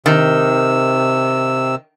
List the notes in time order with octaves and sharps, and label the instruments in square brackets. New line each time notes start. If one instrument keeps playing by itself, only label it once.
[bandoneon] C3 E6 [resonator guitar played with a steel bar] D#3